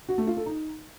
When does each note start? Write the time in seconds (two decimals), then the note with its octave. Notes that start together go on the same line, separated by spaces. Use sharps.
0.09 F#4
0.18 A3
0.27 F4
0.37 A4
0.46 D#4